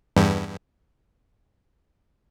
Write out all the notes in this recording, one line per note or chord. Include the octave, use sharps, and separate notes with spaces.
E2 G2